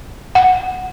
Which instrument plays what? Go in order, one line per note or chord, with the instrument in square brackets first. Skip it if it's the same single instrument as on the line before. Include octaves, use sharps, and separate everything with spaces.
[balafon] F#5